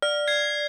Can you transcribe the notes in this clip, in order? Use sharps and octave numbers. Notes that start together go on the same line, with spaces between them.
D5 F6
G#6 C7